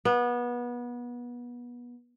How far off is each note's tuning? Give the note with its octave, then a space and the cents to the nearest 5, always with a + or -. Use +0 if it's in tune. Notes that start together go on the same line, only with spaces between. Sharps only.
B3 -25